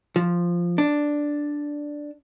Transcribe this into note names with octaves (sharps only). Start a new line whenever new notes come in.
F3
D4